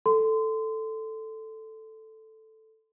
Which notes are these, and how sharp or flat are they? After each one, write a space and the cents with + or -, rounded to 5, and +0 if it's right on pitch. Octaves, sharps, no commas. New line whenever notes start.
A4 +0 C6 -25